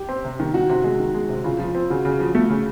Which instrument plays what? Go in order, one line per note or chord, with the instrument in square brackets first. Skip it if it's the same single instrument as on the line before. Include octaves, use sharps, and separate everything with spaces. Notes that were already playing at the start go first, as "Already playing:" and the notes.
Already playing: [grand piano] G4
[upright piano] C4
C3
D#3
[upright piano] D#3 [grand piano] F#4
[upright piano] C3
G#3
D#3
G#3
C3
[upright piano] C#3 [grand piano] F4
[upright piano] F3
C4
[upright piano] C#3 [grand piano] F#4
[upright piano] C#3
F3
A3
C#3